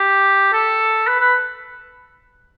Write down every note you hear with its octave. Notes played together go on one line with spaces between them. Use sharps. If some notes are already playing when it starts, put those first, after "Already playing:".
Already playing: G4
A4
B4
B4